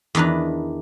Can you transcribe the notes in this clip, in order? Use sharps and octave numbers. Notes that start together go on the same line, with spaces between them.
E2 D#3 D4 A#4 B4